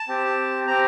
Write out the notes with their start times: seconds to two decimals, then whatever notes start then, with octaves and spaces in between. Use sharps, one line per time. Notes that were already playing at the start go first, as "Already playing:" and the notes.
Already playing: A5
0.08 C4 G4
0.67 C4 G4 A#5